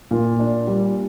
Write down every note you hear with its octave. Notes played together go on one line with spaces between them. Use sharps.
A#2
D4
G3